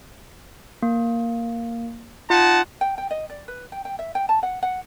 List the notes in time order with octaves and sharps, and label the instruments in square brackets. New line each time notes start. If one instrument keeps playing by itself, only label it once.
[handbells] A#3
[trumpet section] D#4 F#5 A5 [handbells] F4
[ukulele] G5
G5
D#5
D5
B4
G5
G5
E5
G5
A5
F#5
F#5